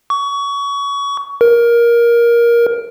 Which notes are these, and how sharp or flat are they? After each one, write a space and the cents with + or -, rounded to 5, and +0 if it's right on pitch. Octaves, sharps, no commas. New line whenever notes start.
C#6 +25
A#4 +15